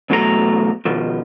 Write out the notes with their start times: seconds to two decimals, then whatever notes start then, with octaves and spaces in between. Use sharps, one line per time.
0.10 E2 B2 F#3 A3 F#4 A#5
0.85 B2 D#3 F3